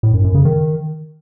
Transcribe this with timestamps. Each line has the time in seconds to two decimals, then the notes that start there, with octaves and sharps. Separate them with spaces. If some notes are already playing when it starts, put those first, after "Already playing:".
0.03 A2
0.14 F#2
0.24 F#2
0.35 C#3
0.45 D#3